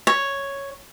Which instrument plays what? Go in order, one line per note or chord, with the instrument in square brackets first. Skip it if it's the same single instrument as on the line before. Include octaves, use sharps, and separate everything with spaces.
[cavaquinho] C#5